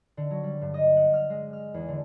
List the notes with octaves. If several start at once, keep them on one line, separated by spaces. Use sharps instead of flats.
D3
F#3
G3
G2
D#5
F#5
F6
G#3
F6
E2
D3